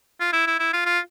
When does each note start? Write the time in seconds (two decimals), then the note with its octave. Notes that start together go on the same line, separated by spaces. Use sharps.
0.20 F4
0.33 E4
0.47 E4
0.59 E4
0.73 F4
0.85 F4